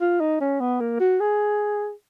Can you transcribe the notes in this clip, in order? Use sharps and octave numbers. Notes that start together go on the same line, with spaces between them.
F4
D#4
C#4
B3
A#3
F#4
G#4